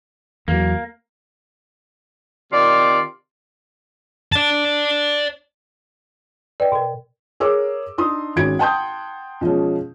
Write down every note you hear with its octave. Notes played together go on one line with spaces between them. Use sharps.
E2 F#3 A#3
C3 D#3 F4 D5
D5 A5
B4 D5 D#5 G5
B2 A#4
G#4 A#4 C#5 D6 E6
D4 D#4 C6 D#6
G#1 C#4 F#4 G#6 D7
F#5 G5 A5 C6 D#6 G6
B2 F3 G#3 C#4